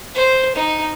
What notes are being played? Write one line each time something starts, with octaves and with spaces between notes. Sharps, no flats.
C5
D#4